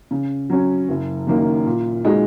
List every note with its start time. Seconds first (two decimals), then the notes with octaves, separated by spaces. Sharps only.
0.11 C#3
0.50 F#3 C#4
0.89 F#1
1.27 F#2 D#3 A#3
1.66 A#2
2.05 G#3 D#4 F#4